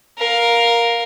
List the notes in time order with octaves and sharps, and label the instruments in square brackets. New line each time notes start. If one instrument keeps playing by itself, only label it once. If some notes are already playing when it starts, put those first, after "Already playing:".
[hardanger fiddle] A#4 F5